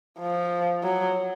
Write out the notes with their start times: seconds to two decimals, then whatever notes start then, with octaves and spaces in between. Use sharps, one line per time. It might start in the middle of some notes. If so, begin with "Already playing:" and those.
0.19 F3
0.83 F#3